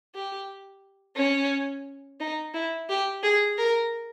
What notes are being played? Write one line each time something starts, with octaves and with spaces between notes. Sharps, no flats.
G4
C#4
D#4
E4
G4
G#4
A#4